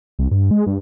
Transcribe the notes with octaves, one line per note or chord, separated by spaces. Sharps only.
C2
G2
G#3
G2